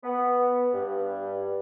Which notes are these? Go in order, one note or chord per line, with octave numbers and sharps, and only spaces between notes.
B3
G2